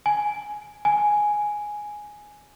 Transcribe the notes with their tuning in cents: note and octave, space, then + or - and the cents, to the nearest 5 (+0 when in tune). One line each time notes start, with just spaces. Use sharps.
G#5 +10
G#5 +5